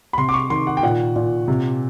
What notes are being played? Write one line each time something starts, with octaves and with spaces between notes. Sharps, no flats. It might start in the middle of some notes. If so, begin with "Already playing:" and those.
B5
C3 C6
D6
C#6
D#3 C6
F#5
G5
A#2 F#5
A#2
C3